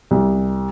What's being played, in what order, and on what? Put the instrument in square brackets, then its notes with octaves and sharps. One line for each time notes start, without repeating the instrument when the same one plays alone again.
[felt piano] C2